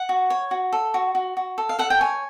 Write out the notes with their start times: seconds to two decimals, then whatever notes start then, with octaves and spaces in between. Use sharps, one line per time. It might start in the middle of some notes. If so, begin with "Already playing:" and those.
Already playing: F#5
0.09 F#4
0.30 C#5
0.51 F#4
0.73 A4
0.94 F#4
1.15 F#4
1.37 F#4
1.58 A4
1.69 F5
1.79 A4 F#5
1.90 G5
2.01 C#5 G#5